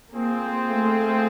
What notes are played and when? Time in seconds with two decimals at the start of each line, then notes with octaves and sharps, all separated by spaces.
0.13 A#3 C4 F4 G#4 C5
0.64 A3